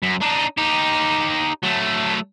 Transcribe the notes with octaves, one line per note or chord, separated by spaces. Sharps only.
F#2
D4 D#4
D#4 G4
F#3 A3